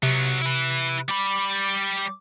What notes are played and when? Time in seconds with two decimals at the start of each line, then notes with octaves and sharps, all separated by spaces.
0.03 C3 F#3 B3
0.42 E4 B4
1.08 G3 B5 D6